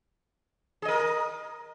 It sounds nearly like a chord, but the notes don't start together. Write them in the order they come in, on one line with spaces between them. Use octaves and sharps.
G#4 D#5 A#4